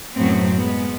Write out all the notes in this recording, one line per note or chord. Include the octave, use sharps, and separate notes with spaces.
F#2 A2 F#3 A3 B3 C4
G#3 B3